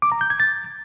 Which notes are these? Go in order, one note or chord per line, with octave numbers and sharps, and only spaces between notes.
D6
A#5
G6
G#6
A6